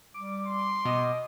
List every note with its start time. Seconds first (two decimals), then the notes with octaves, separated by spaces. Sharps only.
0.14 G3 D6
0.47 C6
0.85 B2 D#5